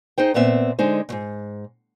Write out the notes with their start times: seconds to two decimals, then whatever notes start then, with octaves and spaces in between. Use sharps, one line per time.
0.18 D#4 G#4 C5 G5
0.34 A#2 B3 C4 E5
0.79 D3 G#3 D#4 C5
1.09 D2 G#2